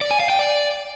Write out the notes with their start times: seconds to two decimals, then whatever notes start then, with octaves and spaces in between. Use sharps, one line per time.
0.01 D5
0.11 G#5
0.20 F5
0.30 G5
0.39 D5